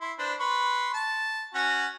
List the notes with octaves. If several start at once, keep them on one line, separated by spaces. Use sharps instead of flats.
E4 C6
D4 B4 C5
B4 C6 C#6
A5
C#4 F#4 F#5